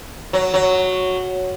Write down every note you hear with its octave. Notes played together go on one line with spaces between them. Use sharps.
F#3
F#3